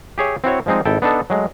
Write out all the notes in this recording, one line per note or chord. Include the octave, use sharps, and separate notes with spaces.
G4 G#4 C#5 E5
C4 E4 F#4 C#5
F3 G3 G#3 C4 D#4
G#1 E4 A4 G5
B3 D4 D#4 A4
F#3 G#3 A3